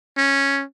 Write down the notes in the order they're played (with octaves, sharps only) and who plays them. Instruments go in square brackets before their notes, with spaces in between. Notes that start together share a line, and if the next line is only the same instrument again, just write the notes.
[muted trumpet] C#4